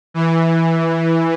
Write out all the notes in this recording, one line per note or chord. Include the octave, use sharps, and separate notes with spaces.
E3